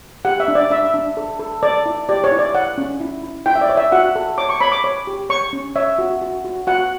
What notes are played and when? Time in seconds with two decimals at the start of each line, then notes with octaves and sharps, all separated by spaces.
0.25 G4 F#5
0.40 E5
0.48 D4
0.55 D5
0.70 D4 E5
0.94 D4
1.17 A4
1.39 A4
1.63 A4 D5
1.86 E4
2.09 G4 D5
2.24 C#5
2.32 E4
2.39 D5
2.55 C#5 F#5
2.78 C#4
3.00 E4
3.23 E4
3.46 E4 G5
3.56 E5
3.61 D5
3.69 C#5
3.77 E5
3.92 F#4 F#5
4.16 A4
4.38 C#5 D6
4.49 C#6
4.61 C#5 B5
4.72 D6
4.84 C#5
5.07 G4
5.30 C#5 C#6
5.53 C#4
5.76 C#5 E5
5.99 F#4
6.22 F#4
6.45 F#4
6.67 F#4 F#5